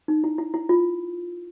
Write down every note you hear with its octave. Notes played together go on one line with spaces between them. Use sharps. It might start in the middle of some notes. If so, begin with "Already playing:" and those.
D#4
E4
E4
E4
F4